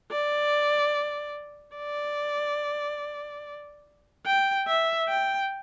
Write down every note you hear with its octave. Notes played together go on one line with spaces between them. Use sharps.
D5
D5
G5
E5
G5